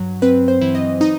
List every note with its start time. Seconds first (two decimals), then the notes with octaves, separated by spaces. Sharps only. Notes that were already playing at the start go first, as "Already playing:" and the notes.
Already playing: G2 F#3
0.22 C4 B4
0.48 C5
0.61 E3
0.75 D#5
1.01 D#4 D#5